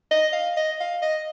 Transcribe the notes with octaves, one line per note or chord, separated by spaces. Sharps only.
D#5
F5
D#5
F5
D#5